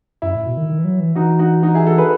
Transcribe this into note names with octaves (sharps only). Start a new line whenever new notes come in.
F#2 E4
A2
B2
D#3
D#3
E3
F#3
E3
E3 D#4 F#4
D#4 F#4
D#4 F#4
E4 G#4
F#4 A4
G#4 B4